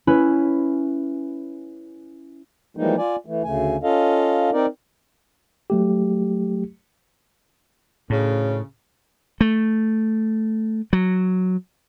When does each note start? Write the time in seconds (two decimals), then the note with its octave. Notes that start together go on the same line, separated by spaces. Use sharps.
0.07 C#4 E4 B4
2.77 E3 F3 G3 G#3 A#3 D#4
2.98 F4 D5 G#5
3.26 E3 A3
3.44 D2 C#3 A3 G#5
3.83 C#4 F4 A4 D#5 F5
4.53 C4 D#4 A#4 D5
5.70 F#3 A3 G4
8.10 D2 A2 C#3
9.41 A3
10.93 F#3